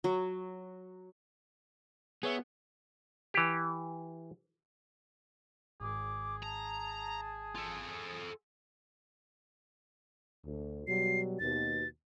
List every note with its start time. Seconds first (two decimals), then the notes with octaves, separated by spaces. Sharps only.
0.04 F#3
2.23 B3 G#4 C#5 E5
3.34 E3 G4
5.80 G#1 G#4 D6
6.43 A5 A#5
7.55 F4 A4
10.45 D2
10.87 B2 F#3 G3 C7
11.39 D#2 B2 A6